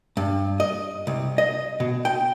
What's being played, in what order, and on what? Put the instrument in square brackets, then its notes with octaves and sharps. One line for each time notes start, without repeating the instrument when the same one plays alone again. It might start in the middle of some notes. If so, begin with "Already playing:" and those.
[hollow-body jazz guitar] G2
D#5
C2
D#5
B2
G5